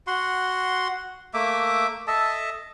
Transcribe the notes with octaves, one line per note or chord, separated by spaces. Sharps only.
F#4 F#5 C6
A3 A#3 E5 D6
A4 D#5 E5 A5